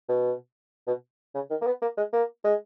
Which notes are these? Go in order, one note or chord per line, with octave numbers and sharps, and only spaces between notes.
B2
B2
C#3
D#3
A#3
B3
A#3
G#3
A#3
G#3